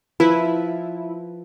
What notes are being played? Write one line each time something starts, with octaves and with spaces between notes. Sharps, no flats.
F3 E4 B4